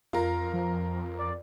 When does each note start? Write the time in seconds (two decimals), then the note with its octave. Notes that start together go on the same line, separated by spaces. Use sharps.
0.13 F2 F4 A#4
0.53 F3
1.19 D5